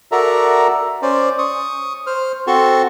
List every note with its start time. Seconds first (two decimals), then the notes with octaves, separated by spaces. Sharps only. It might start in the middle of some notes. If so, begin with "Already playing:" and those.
0.12 F#4 A4 A#4 D5 E5 A#5
1.02 C#4 C5 D5
1.38 C#6 D#6
2.07 C5 F6
2.47 C4 F#4 A4 A5 C6 C#6